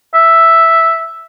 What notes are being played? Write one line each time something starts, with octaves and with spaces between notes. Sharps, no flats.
E5